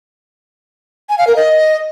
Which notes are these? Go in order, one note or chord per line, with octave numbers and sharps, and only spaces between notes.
G#5
F5
A#4
D#5